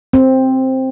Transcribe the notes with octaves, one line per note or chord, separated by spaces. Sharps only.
C4